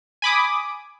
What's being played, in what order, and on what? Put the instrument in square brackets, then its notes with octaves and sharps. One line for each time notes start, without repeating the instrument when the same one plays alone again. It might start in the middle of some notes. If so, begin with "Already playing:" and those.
[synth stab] G#5 B5 D6 D#6